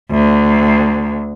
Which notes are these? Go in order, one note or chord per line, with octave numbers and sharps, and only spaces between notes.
D2